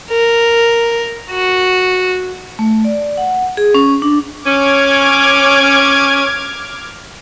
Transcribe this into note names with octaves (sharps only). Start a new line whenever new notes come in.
A#4
F#4
A3
D5
F#5
G#4
C#4
D4
C#4 D6 F6 G#6